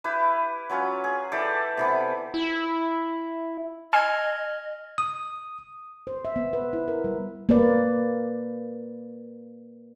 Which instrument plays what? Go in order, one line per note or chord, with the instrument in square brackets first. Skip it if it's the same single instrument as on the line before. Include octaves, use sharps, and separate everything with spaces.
[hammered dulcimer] E4 G4 B4
F#3 C#4 F4 B4
G#4
E3 G4 A4 D5
C3 E3 B3
[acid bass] E4
[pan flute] D#5 [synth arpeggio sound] G#5 C6 E6 [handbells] F6 G#6
[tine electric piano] D#6
[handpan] C5
E5
B3
B4
E4
A#4
G3
A#3 B4 D5